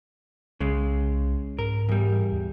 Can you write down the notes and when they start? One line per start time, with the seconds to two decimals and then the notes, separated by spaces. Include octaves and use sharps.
0.60 C2 C#3 G#3
1.59 G#2 A#4
1.89 E2 G3
2.32 D#2